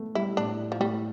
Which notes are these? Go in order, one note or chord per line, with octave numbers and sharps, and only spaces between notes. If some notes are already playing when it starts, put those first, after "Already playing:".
Already playing: A3 B3
G3 E4
A2 D4
F3
A2 G3